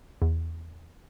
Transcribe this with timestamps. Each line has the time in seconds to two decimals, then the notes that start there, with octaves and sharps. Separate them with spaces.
0.22 E2